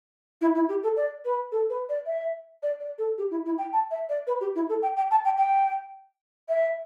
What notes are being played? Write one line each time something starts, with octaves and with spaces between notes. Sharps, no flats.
E4
E4
G4
A4
D5
B4
A4
B4
D5
E5
D5
D5
A4
G4
E4
E4
G5
A5
E5
D5
B4
G4
E4
A4
G5
G5
A5
G5
G5
E5